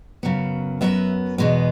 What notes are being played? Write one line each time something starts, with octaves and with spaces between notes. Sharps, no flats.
F#2 C#3 F#3 B3
F#2 C#3 F#3 B3 E5
E2 B2 G#3 B3